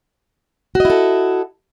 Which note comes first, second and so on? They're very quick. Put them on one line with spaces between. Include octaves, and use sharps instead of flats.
F#4 D#5 E4 A4